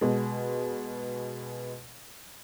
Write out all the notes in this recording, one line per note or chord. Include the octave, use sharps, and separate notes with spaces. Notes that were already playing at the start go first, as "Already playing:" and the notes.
B2 G#3